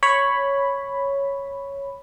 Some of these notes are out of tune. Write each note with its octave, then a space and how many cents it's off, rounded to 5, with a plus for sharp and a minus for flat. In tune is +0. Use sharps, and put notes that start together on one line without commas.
C#5 +0 B5 +0